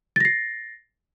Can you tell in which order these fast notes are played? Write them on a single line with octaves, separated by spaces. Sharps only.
A6 A#6 C7